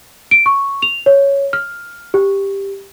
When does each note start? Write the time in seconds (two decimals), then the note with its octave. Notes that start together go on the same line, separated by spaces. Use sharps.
0.31 D7
0.46 C#6
0.82 F7
1.06 C#5
1.53 F6
2.14 G4